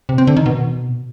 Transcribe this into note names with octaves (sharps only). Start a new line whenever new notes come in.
C3
C4
D3
D#3
B2